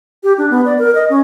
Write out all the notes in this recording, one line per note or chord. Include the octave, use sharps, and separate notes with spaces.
G4
D4
B3
D5
A#4
D#5
C#4